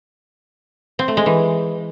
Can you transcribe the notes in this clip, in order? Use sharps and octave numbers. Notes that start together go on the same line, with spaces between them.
C4
A3
G#3
E3